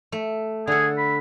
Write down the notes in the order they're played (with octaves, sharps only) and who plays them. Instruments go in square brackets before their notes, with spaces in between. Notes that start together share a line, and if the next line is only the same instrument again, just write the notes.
[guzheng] A3
[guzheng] D3 A4 [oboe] G#4
[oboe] B5